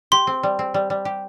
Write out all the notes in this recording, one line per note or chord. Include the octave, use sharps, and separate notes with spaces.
G4 C6
C4
G3
C4
G3
G3
G4